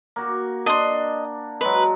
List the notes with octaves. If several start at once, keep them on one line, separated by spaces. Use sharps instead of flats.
A#3 F#4
D4 D#5 C6
F#3 G#3 B4